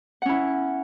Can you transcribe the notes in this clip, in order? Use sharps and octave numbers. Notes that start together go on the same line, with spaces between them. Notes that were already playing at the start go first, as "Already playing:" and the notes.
C#4 E4 F#5